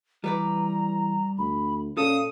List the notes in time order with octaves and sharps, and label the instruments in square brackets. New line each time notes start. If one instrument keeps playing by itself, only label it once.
[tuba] E3 [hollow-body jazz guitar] G3 B4 D5 [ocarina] A#5
[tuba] D2 [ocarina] B5
[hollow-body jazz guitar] A#2 A4 [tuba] C#4 [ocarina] F5 [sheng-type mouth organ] D#6